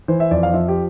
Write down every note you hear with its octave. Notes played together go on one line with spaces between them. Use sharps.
E3 C5
E5
F2 D5
F5
F3 E5
G4